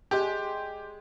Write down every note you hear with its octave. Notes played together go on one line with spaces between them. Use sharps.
G#3 G4 D5 G#5